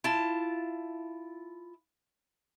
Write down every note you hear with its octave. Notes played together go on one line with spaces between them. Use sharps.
E4 F4 A5